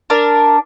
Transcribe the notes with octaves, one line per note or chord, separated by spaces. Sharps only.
D4 A#4